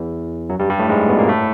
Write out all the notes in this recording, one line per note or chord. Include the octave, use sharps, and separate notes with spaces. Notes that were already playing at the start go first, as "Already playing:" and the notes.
Already playing: E2 E3
F#2 F#3
G2 G3
G2 G3
A2 A3
G#2 G#3
B2 B3
A#2 A#3
A2 A3